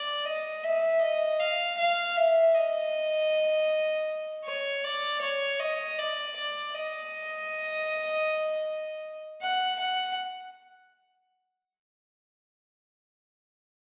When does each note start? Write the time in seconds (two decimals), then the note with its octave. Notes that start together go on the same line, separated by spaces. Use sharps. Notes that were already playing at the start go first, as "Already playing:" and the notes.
Already playing: D5
0.25 D#5
0.64 E5
1.01 D#5
1.40 F5
1.78 F5
2.17 E5
2.55 D#5
4.45 C#5
4.84 D5
5.22 C#5
5.59 D#5
5.98 D5
6.36 D5
6.74 D#5
9.42 F#5
9.79 F#5